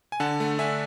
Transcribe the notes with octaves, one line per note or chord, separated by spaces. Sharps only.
G#5
D3 F#5 A5
A3
D4 E5 G#5